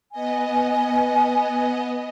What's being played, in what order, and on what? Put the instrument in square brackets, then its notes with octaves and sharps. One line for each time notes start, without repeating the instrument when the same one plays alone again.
[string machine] B3 D#5 [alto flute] G#5